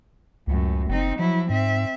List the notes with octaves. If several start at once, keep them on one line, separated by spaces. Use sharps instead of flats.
C#2 F#2 A2
F#1 C4 D#4
F3 F#3 E4
G#2 C4 E5